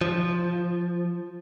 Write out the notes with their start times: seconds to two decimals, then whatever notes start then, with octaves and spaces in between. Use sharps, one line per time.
0.01 F3